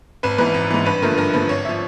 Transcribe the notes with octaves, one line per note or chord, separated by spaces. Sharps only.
G#1 B4
G#2 E3 B4
G#1
G#2 E3
G2 B4
D3 F3 A3 A#4
G2 A#4
D3 F3 A3 B4
G#1 C#5
F3 E5